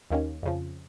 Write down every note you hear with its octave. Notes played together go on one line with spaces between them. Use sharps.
D#2 D#3 A#3 C#4
F2 C#3 F3